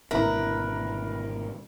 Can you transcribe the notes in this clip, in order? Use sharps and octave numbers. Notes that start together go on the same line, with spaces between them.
G#1 B2 D3 E4 A#4 B4 E5 A#5